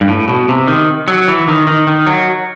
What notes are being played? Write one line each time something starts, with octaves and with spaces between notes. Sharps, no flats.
G2
A2
B2
C3
D#3
F#3
E3
D#3
D#3
D#3
F#3